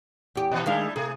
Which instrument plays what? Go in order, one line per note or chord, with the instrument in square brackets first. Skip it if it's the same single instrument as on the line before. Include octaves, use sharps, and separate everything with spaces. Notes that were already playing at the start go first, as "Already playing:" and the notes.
[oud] E2 G4
[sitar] A#2 E3
[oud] D#3 G#3 F5 [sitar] G3 D4 E4
[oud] C3 [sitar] A3 G#4